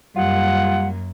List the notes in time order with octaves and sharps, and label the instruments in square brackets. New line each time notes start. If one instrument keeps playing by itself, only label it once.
[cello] F#2 A#3 [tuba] G3 [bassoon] F4 [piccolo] F#5